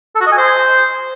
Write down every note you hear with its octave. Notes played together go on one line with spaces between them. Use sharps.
A4
F#4
D#5
G#5
C5